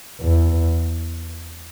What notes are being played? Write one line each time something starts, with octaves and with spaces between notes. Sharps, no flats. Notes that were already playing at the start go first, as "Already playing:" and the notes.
E2